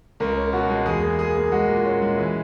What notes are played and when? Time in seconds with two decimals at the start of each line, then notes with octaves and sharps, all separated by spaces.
0.20 C#2 A#4
0.37 C#4
0.53 B2 F#4
0.70 G#3
0.86 E2 G#4
1.02 A#3
1.19 A#3 G#4
1.36 A#3
1.52 G#3 F#4
1.68 A#2
1.85 C#4
2.02 G#3
2.18 E3